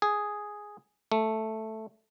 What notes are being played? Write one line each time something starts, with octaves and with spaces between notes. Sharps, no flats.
G#4
A3